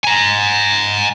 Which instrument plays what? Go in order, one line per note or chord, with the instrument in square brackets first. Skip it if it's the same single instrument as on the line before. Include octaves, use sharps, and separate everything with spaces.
[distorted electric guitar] G#5 A#5